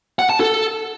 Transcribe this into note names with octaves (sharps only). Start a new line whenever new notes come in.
F#5
A5
A4